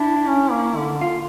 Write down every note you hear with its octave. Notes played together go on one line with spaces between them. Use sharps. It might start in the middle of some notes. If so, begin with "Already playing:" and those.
Already playing: D4 E4
C#4
A#3
D3
F4